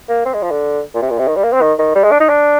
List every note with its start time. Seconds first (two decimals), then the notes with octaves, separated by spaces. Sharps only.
0.09 A#3
0.25 C4
0.34 G#3
0.42 F3
0.51 D3
0.94 A#2
1.02 C3
1.10 A#2
1.19 C3
1.28 D#3
1.36 G3
1.44 A#3
1.53 C4
1.62 D#3
1.79 D#3
1.95 G3
2.03 G#3
2.11 D4
2.20 D#4
2.29 D4